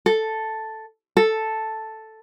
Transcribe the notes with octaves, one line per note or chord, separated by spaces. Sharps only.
A4
A4